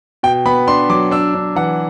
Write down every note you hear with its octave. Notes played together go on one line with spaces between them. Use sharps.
B2 G5
B3 B5
D4 C6
F#3 D6
D4 E6
D4
E3 F#5